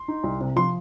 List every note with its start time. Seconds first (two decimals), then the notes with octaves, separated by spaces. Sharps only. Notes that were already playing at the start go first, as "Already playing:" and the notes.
Already playing: C6
0.08 D#4
0.23 C2
0.41 C3
0.56 F3 C6